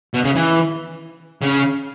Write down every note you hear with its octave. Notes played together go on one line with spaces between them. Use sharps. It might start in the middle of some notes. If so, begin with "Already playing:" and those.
B2
C#3
E3
C#3